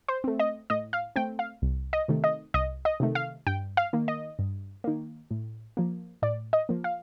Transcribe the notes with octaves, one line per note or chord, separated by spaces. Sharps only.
C5
A3 C4
D#5
A2 D#5
F5
A3 C4 G5
F5
C2
D#5
C3 D#3 A3
D#5
C2 D#5
D#5
C3 D#3 A3
F5
G2 G5
F5
D#3 A#3
D#5
G2
D#3 A#3
A2
F3 A#3
A2 D5
D#5
F3 A#3
F5